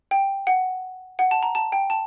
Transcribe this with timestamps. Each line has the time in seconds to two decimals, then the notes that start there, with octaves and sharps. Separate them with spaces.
0.11 G5
0.47 F#5
1.19 F#5
1.31 A5
1.43 A#5
1.55 A5
1.72 G5
1.90 A5